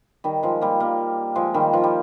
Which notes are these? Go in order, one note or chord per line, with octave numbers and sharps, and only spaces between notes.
D#3 G3
F3 G#3
G3 A#3
G3 A#3
F3 G#3
D#3 G3
F3
G3